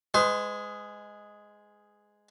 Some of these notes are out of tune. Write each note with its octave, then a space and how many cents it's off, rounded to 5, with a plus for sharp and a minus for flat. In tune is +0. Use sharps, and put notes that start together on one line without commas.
G#3 +0 B4 +45 C6 +5